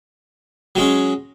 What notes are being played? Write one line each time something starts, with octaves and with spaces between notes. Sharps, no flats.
F#3 G#3 C#4